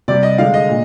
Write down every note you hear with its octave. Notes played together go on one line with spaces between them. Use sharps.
C3 G3 D5
D#5
D3 G#3 F5
D#5
A#2